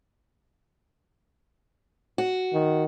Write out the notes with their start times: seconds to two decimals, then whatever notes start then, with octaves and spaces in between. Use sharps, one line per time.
2.18 F#4
2.53 D#3